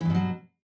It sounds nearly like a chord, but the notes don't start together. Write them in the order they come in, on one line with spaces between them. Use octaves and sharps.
E3 G2 B2 F#3